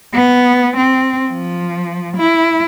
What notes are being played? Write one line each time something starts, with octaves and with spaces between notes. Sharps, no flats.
B3
C4
F3
E4